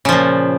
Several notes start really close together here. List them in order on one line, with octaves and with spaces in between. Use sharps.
C#3 F3 A#2